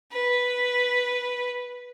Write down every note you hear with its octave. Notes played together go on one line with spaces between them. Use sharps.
B4